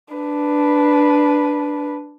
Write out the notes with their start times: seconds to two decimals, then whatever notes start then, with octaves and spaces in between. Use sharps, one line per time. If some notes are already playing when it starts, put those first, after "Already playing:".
0.14 D4 B4